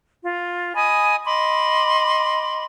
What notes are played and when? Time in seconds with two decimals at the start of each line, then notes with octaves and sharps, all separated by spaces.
0.23 F4
0.75 D#5 G#5 B5 D#6
1.25 D#5 B5 C6 D6